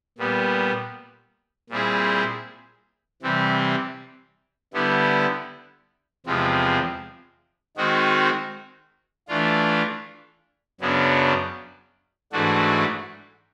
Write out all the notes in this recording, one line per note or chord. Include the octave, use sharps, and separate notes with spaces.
A#2 G3 B3
A#2 G3 C4 E4 G#4
C3 E3 G3 C4
D3 G3 B3 E4
E2 C3 F3 G#3 C4
D#3 G#3 C4 D#4 F#4
E3 A3 D4 F4
F#2 C#3 F#3 B3 D4
G#2 E3 A3 D4 F#4